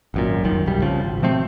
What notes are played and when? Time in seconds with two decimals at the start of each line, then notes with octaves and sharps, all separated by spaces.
0.14 G#1 F#2 A#2
0.44 F1 C2 F#2 D#3
0.66 F1 B1 G3
0.82 C2 C#3 F3
1.05 G#1
1.22 B2 F3 A3 C4